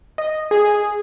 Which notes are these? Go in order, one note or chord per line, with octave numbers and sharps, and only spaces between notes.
D#5
G#4